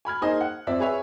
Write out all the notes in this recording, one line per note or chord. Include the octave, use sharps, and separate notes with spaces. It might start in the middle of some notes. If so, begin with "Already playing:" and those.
G#5 B5 F6 G#6
A#3 D#4 G#4 C5 D#5 G#5
F#5
F2 C4 D5 E5
G#4 B4 C#5 E5